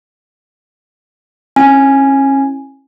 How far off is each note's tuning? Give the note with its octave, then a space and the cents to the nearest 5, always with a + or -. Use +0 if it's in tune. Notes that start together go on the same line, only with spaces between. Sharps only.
C#4 -35 E4 -5 G#5 +0